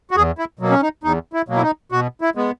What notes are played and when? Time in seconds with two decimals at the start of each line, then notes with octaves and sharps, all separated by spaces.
0.11 F#4
0.16 E2 G#4
0.38 E4
0.59 B2 F#3 A#3
0.70 C#4
0.82 D#4
1.03 E2 D#4
1.33 E4
1.48 B2 F#3 A#3
1.56 E4
1.62 D#4
1.92 B2 F#4
2.21 E4
2.35 G#3 B3